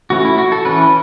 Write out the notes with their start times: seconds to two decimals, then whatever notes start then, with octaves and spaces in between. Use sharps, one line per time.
0.10 E3 A3 C#4 F#4
0.25 E4
0.38 F#4
0.52 A4
0.65 E3 C#4 B4